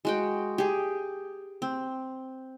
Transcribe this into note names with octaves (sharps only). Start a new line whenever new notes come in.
G#3 F#4 G5
G4 G#4
C4